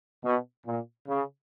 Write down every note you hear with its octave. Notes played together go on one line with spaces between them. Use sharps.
B2
A#2
C#3